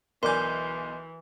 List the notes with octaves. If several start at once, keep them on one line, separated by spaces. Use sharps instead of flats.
B1 E3 A#4 D5 G#5 C6 D6 G6